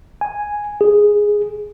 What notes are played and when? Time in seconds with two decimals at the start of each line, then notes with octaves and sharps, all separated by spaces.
0.21 G#5
0.81 G#4